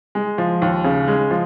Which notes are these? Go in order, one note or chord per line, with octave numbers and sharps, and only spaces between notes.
G#3
F3
D#2
C#3
G#3
F3